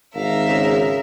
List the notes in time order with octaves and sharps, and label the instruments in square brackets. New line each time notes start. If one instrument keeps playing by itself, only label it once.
[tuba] G#1 [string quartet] A#4 E5 [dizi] F5
[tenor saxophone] C#3